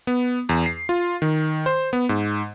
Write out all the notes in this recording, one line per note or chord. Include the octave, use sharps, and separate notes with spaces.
B3
E2
C7
F4
D#3
C5
B3
G#2